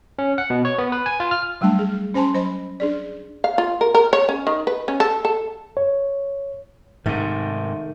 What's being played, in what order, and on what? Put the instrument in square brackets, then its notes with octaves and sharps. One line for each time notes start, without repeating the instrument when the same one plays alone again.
[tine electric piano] C#4
F#5
B2
C#5
B3
B4
G#5
F4
F6
[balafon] F#3 G3 A3 D4 A5
G#4
C#4 C5 G#5 A5 C6
F#3 C5 D#5 B5
D4 G#4 D5
[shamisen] F5
F4
A#4
A#4
C#5
C#4
D#3
B4
C#4
A4
A4
[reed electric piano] C#5
[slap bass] G#2 C3 [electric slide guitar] D#3 [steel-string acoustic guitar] A3